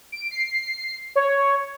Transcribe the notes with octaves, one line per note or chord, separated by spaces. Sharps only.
D7
C7
C#5